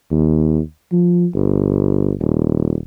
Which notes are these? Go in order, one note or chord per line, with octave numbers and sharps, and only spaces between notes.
D#2
F3
G1
D#1